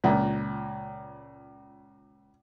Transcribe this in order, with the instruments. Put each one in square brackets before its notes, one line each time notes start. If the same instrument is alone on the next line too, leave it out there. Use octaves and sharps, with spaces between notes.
[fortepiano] C#2 A#2